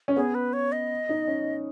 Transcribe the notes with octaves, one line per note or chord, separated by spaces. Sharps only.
C#4
B3 G#4
B4
C#5
D#5
D#4
C#4